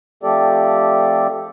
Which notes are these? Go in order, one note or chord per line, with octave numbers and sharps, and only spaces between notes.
F3 A3 C4 G4 A4 D5